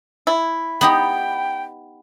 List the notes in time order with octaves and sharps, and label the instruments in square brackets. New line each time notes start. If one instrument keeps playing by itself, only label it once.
[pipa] E4
[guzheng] B3 D#4 G4 [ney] G5